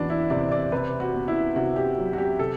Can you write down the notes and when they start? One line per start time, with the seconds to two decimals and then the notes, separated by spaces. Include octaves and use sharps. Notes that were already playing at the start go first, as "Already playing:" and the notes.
Already playing: E2 E3 D4 F#4 B4
0.10 E4
0.30 C3 D5
0.52 D5
0.72 C3 B4
1.00 F#4
1.14 B3
1.28 E4
1.55 C3 F#4
1.76 G4
1.98 F#3
2.13 F#4
2.18 G4
2.39 C3 A4